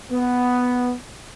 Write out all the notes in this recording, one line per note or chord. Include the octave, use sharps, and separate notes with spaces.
B3